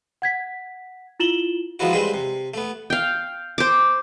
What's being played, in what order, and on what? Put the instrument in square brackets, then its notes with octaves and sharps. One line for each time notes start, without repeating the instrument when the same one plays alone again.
[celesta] F#5 G#6 B6
E4 F4 E7 F#7 G7
[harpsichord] F3 F#3 G#3 B3 E4 F#4
G3 G#3 C4 G#4 B4
C3
A3 B3
[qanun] F5 G5
C5 D6